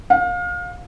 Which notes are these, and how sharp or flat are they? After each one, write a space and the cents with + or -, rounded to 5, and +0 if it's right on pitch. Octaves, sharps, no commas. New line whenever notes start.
F5 +30